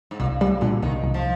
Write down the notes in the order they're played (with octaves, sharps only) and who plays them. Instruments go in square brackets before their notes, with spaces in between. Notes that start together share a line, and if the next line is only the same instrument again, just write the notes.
[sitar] G#2
[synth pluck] C2 [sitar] A#2
[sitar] A#2 [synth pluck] G3
[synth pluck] A#2 [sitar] D3
[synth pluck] C2 [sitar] D#3
[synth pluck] C2
[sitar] F3